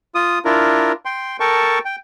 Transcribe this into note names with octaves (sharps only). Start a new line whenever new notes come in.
F4 D#6
D4 E4 F4 A#4
G5 C6
A4 A#4 G5 A5 C#6
G5